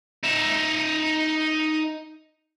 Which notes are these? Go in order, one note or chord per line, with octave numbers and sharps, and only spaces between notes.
D#4 E5